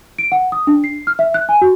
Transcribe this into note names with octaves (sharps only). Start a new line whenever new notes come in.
D7
F#5
D#6
D4
C7
F6
E5
F#6
G#5
F#4